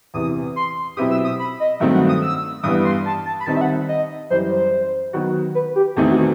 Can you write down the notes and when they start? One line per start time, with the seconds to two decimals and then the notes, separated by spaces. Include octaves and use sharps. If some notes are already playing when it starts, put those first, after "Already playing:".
0.14 E2 C3 E3 D#6
0.56 C6
0.97 B2 F#3 C4 E4 G4 D#6
1.11 E6
1.24 D#6
1.39 B5
1.60 D#5
1.80 G2 D#3 F#3 A3 C4 E5
1.94 F#5
2.09 D#6
2.21 E6
2.63 G2 E3 G3 B3 D#6
2.85 C6
3.05 A5
3.26 A5
3.40 B5
3.46 D#3 G3 C4 D#4 A5
3.56 E5
3.61 F#5
3.89 D#5
4.30 F#2 E3 G3 C5
4.51 C5
5.13 D#3 F#3 B3 F#4
5.55 B4
5.76 G4
5.96 E2 D#3 A3 C4 D#4 A4
6.11 F#4